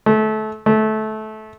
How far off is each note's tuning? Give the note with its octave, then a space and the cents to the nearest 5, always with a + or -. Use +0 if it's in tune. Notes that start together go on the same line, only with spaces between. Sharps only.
A3 -25
A3 -20